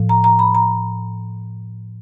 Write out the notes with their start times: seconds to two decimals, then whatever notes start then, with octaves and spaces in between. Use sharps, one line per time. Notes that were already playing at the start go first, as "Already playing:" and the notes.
Already playing: A2 F3
0.09 A#5
0.24 A#5
0.39 B5
0.55 A#5